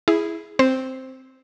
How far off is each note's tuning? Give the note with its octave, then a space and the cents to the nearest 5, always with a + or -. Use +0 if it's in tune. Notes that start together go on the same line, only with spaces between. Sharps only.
E4 +0 G#4 +0
C4 +0 C5 +0